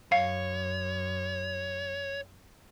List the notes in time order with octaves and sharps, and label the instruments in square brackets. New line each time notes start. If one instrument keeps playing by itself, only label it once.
[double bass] F#2 [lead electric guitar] C#5 [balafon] F5